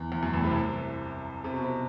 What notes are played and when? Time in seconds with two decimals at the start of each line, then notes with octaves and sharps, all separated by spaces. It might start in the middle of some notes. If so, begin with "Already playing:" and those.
Already playing: E2
0.12 E2
0.23 F#2
0.33 A1 A2
0.44 C2 C3
1.44 C3
1.54 B2
1.64 C3